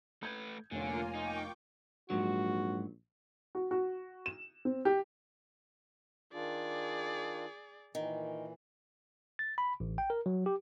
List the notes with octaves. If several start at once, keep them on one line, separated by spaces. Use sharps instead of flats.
A3 B4 G6 G#6
F1 D3 A#3 F4 C#5 G#5
D#4 G5 C#6 D6
A#1 G#2 F#3 F#4
F#4
F#4
E7
C4
G4
D#3 D4 F4 G#4 D5
A#2 D#3 E3
A6
B5
A1
G5
A#4
F#3
G4